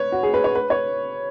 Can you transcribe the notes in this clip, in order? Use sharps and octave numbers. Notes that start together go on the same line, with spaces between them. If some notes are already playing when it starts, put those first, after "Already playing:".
Already playing: B4 C#5
F#4
G#4
B4
C#5
B4
C#5